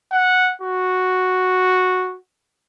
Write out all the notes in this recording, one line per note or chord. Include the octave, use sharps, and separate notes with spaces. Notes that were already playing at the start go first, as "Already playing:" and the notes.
F#5
F#4